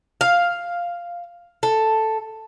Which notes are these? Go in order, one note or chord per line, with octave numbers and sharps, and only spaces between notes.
F5
A4